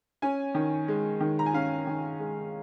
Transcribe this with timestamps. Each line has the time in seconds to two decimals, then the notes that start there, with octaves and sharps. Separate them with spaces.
0.22 C#4 G#5
0.55 D#3
0.88 G#3
1.20 D#3
1.39 A#5
1.46 G#5
1.54 C#4 F5
1.87 D#3
2.19 G#3